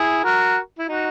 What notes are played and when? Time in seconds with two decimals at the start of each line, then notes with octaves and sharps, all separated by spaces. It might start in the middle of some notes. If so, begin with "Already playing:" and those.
Already playing: E4 G#4
0.24 F#4 A#4
0.79 E4
0.88 D#4 F#4